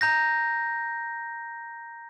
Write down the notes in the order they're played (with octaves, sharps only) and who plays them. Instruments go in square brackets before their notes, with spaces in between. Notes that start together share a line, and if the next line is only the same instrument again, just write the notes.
[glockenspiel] A#5 G6 A#6